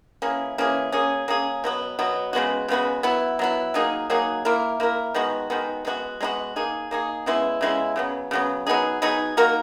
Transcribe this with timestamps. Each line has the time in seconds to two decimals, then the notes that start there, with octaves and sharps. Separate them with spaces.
0.22 E3 A#3 C#4 G#4
0.58 E3 A#3 C#4 G#4
0.92 A#3 C#4 G#4
1.28 A#3 C#4 G#4
1.64 B2 F#3 B3
1.99 B2 F#3 B3
2.33 C#3 G#3 B3 F#4
2.68 C#3 G#3 B3 F#4
3.03 F#3 B3 E4
3.39 F#3 B3 E4
3.74 F#3 A#3 D#4 G#4
4.10 F#3 A#3 D#4 G#4
4.45 A#3 E4 A#4
4.80 A#3 E4 A#4
5.14 D#3 G#3 B3 F#4
5.50 D#3 G#3 B3 F#4
5.85 G#3 B3 D#4 F#4
6.21 G#3 B3 D#4 F#4
6.56 A#3 D#4 G#4
6.91 A#3 D#4 G#4
7.26 C#3 G#3 B3 E4
7.61 C#3 G#3 B3 E4
7.96 C#3 F#3 B3
8.31 C#3 F#3 B3
8.67 F#3 B3 D#4 G#4
9.02 F#3 B3 D#4 G#4
9.37 A#3 D#4 F#4 A#4